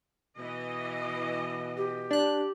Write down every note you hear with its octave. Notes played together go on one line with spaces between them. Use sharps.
B2 E3 D#5
G4
D4 F#6